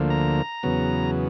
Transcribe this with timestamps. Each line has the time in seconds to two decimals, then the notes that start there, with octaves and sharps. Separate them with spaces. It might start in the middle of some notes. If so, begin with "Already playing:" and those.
Already playing: D2 D3 F3 A#3
0.10 A#5
0.63 E2 C#3 F#3 B3